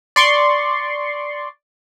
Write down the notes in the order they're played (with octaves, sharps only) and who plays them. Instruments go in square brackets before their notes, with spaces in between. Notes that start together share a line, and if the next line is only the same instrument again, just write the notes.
[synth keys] D5 C6 C#6